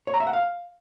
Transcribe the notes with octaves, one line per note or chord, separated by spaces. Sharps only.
C#5
A#5
E5
F#5
F5